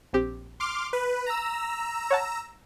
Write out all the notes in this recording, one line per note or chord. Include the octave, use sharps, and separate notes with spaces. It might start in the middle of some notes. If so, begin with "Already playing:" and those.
A#1 C4 G4
C6 D6 F6
B4
A#5 E6
C#5 F#5 A5